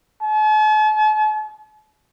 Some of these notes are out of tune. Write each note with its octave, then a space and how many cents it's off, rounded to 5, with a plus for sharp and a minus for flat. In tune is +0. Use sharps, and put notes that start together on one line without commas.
A5 -45